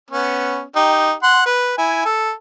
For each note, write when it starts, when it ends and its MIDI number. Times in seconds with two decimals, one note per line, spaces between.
0.11 0.62 59
0.11 0.62 61
0.76 1.12 63
0.76 1.12 67
1.23 1.43 78
1.23 1.43 84
1.46 1.76 71
1.78 2.04 64
1.78 2.04 80
2.05 2.31 69